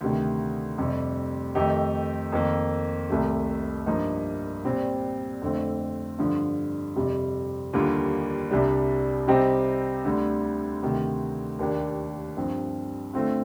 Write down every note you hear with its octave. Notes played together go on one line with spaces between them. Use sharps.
D2 C3 D#3
F2 C3 G3
F2 D#3 A3 D#4 G4
F2 D#3 A#3
C2 C3 D#3 A3
G2 F3 A#3 D#4
A#2 G3 C4 G4
F2 D3 A3 C4
G2 D3 F3
F2 C3 G3
D#2 D3 G3 A#3 F4
C2 C3 G3 D4
C3 G3 C4 D#4 G4
D2 D3 G3
D2 C3 D#3
D#2 D#3 A#3 D4 G4
G2 F3 C4
D3 A3 C4 F4